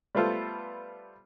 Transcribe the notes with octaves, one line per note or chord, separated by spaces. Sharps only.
G3 A3 B3 F4 A4 C5